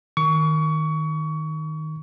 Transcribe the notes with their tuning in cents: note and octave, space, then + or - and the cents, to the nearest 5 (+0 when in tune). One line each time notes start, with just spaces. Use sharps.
D#3 +0 C#6 +25